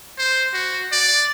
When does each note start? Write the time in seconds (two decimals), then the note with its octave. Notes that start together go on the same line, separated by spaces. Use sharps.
0.18 C5
0.54 F#4
0.92 D5